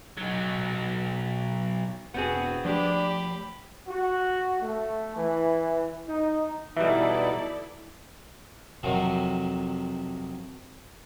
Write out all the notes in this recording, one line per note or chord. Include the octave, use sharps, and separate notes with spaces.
B1 F#3
E1 B3 C4 F#4 G#4
F3 A3 D4 G4 B5
F#4
A3
E3
D#4
B2 E3 G3 D#4 E4 A4 D5 E5
F2 C3 D#3 F#3